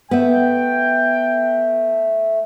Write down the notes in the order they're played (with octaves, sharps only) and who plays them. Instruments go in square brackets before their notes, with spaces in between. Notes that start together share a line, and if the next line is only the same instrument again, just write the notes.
[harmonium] A3 [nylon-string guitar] B3 E5 [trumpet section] G5